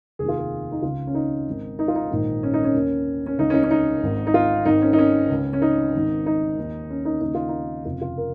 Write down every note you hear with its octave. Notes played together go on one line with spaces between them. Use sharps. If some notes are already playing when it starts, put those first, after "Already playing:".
F1 D#2 D#3 G#4
F4
G#4
D#4
C#2 C#3 F4
C#4
D#4
G#1 G#2 D#3
D#4
F4
D#4
A#1 G#2 D#3
C#4
D#4
C#4
D#2 D#3
C#4
C#2 C#3 D#4
C#4
D#4
C#4
D#4
G#1 G#2 D#3
D#4
F4
G#1 G#2 D#3 D#4
C#4
D#4
C#4
C#2 C#3
C#4
D#4
G#1 G#2 D#3
D#4
D#2 D#3
C#4
D#4
D#2 C#3 D#4
F4
D#4
F1 F2 C#3 F4
F4
A#4